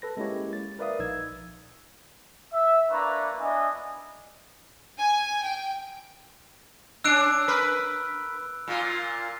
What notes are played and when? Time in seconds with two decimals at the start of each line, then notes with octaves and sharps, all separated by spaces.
0.02 A4 B4 A#6
0.17 G#3 A#3 C#4 E4 G4 C#5
0.53 A6
0.79 A#4 B4 D5 E5 F5 D#6
0.99 A#1 D#4 E6 G#6
2.53 E5
2.91 A#3 D4 E4 B4 A#5 C#6
3.38 B3 D4 E4 D#5 E5 G#5
4.98 G#5
5.44 G5
7.04 C#4 D4 E6 F#6 D7
7.48 A#4 B4
8.68 A#2 F4